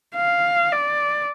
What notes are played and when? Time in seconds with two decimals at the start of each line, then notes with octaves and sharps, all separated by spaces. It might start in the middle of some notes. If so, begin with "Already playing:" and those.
0.15 F5
0.72 D5